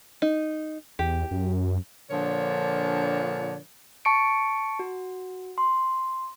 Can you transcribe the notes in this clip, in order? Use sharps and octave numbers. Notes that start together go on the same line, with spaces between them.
D#4
E2 G4
F#2
A#2 D3 F3 D4 A#4 C#5
A5 C#6 C#7 D7
F#4
C6